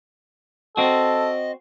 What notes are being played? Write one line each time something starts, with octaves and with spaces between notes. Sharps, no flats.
C4 F#4 A4 D#5